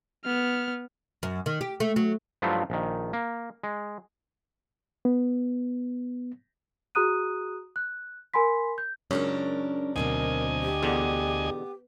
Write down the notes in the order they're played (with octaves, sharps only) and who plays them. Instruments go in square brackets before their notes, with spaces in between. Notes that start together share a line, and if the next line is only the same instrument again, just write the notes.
[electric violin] B3 F6
[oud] F#2
D#3
G4
A3
F#3
[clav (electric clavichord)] G2 F3 F#3 A3 E4 F4
A#1 D#3
A#3
G#3
[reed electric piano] B3
[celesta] F#4 G#4 A#5 D#6 F#6 D#7
F#6
A#4 G#5 B5 C6 B6
G6
[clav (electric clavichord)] C#2 F#2 [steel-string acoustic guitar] C#4 D4 A#4
[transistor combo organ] D2 D#5 G#5 [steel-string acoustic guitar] B2 F#3 C4 [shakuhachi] A#4
[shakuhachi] G4
[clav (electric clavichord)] E2 B2 D3 [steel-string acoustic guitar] B3